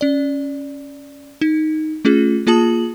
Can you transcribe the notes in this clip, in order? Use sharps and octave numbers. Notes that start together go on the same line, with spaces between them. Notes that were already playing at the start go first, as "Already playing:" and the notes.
C#4 D5
D#4
A3 C#4 F4 G#4
A#3 F4 G#4 A5 D#6 F#7